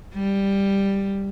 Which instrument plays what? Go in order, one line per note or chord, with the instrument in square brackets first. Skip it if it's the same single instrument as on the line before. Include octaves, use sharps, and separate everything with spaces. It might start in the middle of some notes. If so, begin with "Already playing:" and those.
[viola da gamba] G3